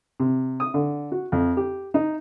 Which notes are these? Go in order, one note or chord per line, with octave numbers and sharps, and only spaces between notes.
C3
D#6
D3
F#4
F2
G4
D#4